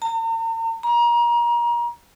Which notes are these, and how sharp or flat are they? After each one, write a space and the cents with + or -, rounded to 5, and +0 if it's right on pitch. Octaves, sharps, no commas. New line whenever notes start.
A#5 -45
A#5 +30